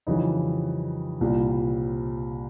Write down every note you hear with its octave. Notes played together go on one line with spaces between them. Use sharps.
F2 C#3 E3 G3 D#4
C2 A#2 G3